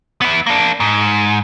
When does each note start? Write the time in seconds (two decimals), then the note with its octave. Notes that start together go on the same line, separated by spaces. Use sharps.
0.21 B3 E4
0.46 A#3 D4
0.80 G#2